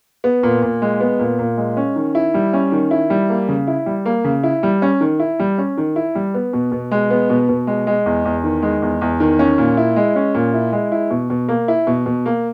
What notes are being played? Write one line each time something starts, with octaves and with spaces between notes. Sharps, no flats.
B3
A#2
A#2
G#3
B3
A#2
A#2
G#3
C#4
D#3
E4
G3
C#4
D#3
E4
G3
A#3
C#3
E4
G3
A#3
C#3
E4
G3
C#4
D#3
E4
G3
C#4
D#3
E4
G3
B3
B2
B2
G#3
B3
B2
B2
G#3
G#3
E2
E2
D#3
G#3
E2
E2
D#3
C#4
A#2
E4
G#3
C#4
A#2
E4
G#3
E4
B2
B2
A#3
E4
B2
B2
A#3